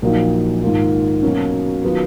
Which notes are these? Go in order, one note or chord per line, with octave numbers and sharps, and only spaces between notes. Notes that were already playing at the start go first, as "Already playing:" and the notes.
A#1 A#2 F#3 A#3 D#4
G#2 D#3 A#3 F4
B2 F#3 A#3 C#4
D#3 F#3 B3 F4